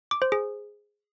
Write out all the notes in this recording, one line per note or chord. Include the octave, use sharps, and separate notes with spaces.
D6
C5
G#4